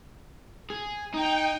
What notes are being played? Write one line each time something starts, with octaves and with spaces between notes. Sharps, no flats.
G#4
D#4 G5